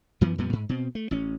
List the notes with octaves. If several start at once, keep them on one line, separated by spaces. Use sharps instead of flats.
F#2 E3 F3 B3
F2 A#2 G3 B3
G#2
B2 C4
A3
A1 C#4